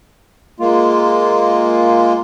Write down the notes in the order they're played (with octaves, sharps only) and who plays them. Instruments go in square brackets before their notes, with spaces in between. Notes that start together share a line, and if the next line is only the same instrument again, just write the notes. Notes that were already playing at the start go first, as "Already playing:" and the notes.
[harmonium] G#3 A#3 F4